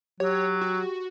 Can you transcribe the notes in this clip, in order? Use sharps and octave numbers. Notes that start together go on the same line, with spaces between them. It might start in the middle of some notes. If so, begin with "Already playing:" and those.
F#3 G4 C#5
F#4